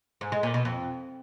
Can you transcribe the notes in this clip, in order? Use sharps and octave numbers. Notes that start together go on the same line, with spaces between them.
G#2
G#3
A#2
B2
F2